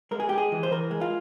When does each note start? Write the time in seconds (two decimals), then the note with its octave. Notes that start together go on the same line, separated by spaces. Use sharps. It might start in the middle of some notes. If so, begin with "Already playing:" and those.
0.11 G#3 A#4
0.20 G#4
0.29 G#3 G4
0.38 G#4
0.52 E3
0.63 C5
0.71 E3 A#4
0.91 G#3
1.01 F4